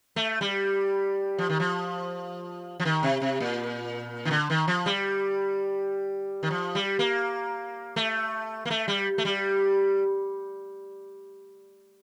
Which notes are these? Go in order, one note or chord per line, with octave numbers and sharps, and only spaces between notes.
A3
G3
F3
D#3
F3
F3
D#3
C3
C3
A#2
D#3
D3
D#3
F3
G3
D#3
F3
G3
A#3
A3
A#3
A3
G3
A3
G3